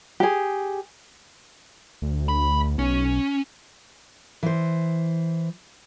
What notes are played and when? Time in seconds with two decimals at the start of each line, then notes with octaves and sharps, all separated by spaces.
0.20 G4 G#4
2.02 D2
2.29 B5
2.79 B1 C#4
4.43 E3 C5